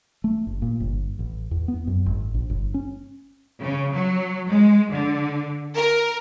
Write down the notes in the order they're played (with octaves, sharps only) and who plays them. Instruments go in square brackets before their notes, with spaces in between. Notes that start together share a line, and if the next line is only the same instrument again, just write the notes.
[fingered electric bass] A3
G1
A#2
G1
A1
E2
B3
F#2
G#1
A#1
G1
C#4
[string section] C#3
F#3
G#3
D3
A#4